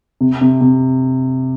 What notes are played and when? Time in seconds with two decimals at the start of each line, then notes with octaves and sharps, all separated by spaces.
0.21 C3
0.41 C3
0.61 C3